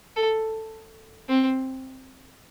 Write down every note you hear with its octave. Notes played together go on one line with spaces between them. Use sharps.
A4
C4